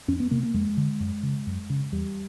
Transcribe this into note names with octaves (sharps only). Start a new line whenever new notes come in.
F2 C#4
B3
C3 A#3
A#3
F2 G#3
D3
F#2
C#3
F#2
C#3
E2 G3